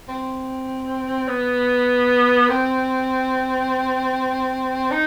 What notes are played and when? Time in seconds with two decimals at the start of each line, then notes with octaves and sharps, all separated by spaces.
0.09 C4
1.28 B3
2.50 C4
4.91 D#4